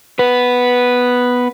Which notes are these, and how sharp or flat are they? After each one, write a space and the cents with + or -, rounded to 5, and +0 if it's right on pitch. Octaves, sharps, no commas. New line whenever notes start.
B3 +0 B4 +0